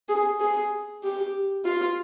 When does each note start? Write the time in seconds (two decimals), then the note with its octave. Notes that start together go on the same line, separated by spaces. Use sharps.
0.09 G#4
0.40 G#4
1.03 G4
1.65 F4